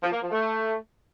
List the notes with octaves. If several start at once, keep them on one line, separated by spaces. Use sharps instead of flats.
F3
A#3
F3
A3